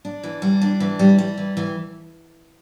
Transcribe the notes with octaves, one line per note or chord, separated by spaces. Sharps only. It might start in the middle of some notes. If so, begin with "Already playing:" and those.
D4
E3
G3
D4
E3
G3
G3
E3
E3